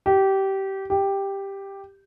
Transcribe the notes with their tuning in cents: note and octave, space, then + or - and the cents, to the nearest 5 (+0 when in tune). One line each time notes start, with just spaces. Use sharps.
G4 -20
G4 +5